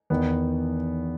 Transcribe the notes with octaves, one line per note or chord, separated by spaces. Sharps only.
E2 D#3 B3